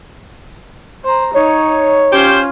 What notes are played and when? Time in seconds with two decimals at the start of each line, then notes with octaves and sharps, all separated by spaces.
1.05 C5 A#5
1.34 D#4 C#5
2.13 C#4 F4 G4 C5